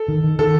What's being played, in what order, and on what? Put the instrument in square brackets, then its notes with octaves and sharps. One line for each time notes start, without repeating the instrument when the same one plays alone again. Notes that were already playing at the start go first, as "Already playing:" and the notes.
Already playing: [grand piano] A4
[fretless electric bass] D#3
D#3
[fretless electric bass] D#3 [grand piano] A4